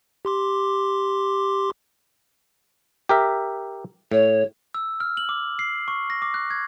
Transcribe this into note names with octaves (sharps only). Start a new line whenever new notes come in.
G4 C6 D6
G4 A#4 E5
A2 C#5
E6
F6
F#7
D6
C7
C#6
A#6
D6
F#6
G#6